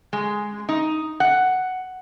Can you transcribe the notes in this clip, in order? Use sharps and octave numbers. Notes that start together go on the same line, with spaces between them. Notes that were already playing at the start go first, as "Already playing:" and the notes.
G#3
D#4
F#5